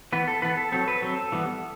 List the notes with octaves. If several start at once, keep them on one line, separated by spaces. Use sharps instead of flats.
E3 B3 B4
A4
E3 B3 B4
A4
F#3 C4 A4
B4
F#3 C4 A4
E3 G3 B3